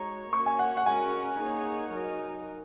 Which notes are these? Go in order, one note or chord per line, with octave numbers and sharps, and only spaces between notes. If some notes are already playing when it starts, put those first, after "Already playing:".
Already playing: G#3 D#4 F#4 C#5 A#5
A#3 C#4 F#4 C#5 C#6
G#5
F#5
F#5
G#3 C#4 F#4 A#4 G#5
A#3 D#4 G#4 C#5
F#3 D#4 A#4